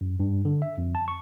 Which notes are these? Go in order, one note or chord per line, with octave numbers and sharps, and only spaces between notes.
F#2
G2
D3
E5
F2
A5
C#6